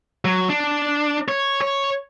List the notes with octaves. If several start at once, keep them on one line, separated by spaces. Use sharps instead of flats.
F#3
D4
C#5
C#5